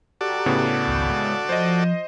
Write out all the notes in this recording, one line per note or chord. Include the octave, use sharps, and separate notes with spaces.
F#4 G4 A4 D5 A#5
A2 C#3 B3
G#1 C#2 G6
G#3
F3 C5 D#5